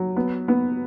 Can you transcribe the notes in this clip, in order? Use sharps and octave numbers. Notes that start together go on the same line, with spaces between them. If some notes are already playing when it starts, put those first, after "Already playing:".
Already playing: F#3
B3
B3